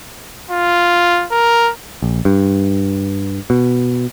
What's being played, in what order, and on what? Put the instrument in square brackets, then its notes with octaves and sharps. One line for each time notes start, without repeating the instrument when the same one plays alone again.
[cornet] F4
A#4
[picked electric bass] A#1
G2
B2